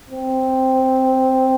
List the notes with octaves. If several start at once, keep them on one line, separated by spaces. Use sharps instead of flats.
C4